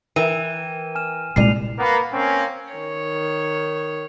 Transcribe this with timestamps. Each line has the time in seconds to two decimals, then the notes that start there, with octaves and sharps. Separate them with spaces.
0.16 E3 A#4 G5 D#7 E7
0.95 G#5 F6 E7
1.36 C2 A#2 G#3 D5 C7 D#7 F7
1.79 A#3 B3
2.12 A#3 C4 C#4
2.72 D#3 C#5